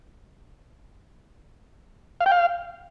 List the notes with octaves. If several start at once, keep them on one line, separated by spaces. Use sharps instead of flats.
F5
G5
F5